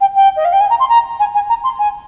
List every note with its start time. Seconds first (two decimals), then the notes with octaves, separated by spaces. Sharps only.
0.01 G5
0.15 G5
0.36 D#5
0.45 F5
0.53 G5
0.60 G#5
0.70 A#5
0.80 C6
0.89 A#5
1.20 G#5
1.34 G#5
1.49 A#5
1.64 C6
1.79 G#5